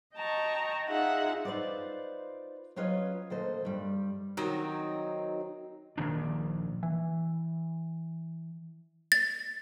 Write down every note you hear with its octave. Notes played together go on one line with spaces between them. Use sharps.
D#5 G5 A5 A#5 C#6
D#4 F4 G#4 E5 F#5
D#4 F4 B4 C5 D5
F#3 C#4 F4 B4 C#5 D#5
D2 A#2 A4 C5 D#5
G2 G3
D#3 F#3 C4 D#4
A#1 A#2 D#3 D4
E3
A6